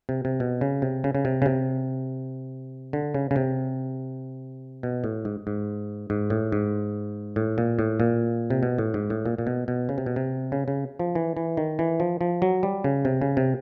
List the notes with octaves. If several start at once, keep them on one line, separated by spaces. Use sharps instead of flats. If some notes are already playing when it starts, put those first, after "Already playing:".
C3
C3
B2
C#3
C3
C#3
C#3
C3
C#3
C3
D3
C#3
C#3
C3
B2
A2
G#2
G#2
G#2
A2
G#2
A2
A#2
A2
A#2
C3
B2
A2
G#2
A2
A#2
A#2
B2
B2
C#3
C3
B2
C3
C#3
C#3
F3
E3
E3
D#3
E3
F3
F3
F#3
G3
C#3
C3
C#3
C3